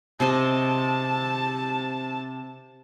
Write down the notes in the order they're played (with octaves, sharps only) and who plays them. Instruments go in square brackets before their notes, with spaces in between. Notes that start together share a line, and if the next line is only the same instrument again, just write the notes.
[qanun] C3 C5 D#5 [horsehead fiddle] A5